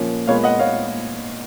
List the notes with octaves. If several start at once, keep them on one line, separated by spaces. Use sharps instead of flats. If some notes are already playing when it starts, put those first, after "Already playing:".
Already playing: A#2 F3 A#3 C#4
A#2 G#3 B3 C#5 F5
D#5 F#5
C#5 F5